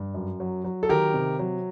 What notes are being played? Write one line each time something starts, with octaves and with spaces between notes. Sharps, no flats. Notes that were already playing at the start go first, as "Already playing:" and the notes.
Already playing: G2
F#2
F#3
F#3
A4
D#3 G4 A#4
C3
F#3